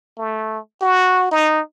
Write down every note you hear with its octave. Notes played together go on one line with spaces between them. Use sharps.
A3
F#4
D#4